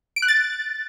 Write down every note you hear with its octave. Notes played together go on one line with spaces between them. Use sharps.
D7
F#6
A6